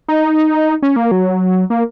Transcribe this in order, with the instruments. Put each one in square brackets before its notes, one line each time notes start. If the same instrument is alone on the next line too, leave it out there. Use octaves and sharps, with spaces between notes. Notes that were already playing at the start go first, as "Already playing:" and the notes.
[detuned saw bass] D#4
C#4
A#3
F#3
A#3